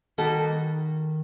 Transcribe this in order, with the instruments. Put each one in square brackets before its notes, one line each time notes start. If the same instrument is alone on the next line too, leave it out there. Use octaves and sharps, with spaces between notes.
[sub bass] D#3 [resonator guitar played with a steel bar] G3 A#3 D#4 F#4 A4